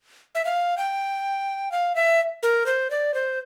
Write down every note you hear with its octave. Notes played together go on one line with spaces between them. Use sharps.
E5
F5
G5
F5
E5
A#4
C5
D5
C5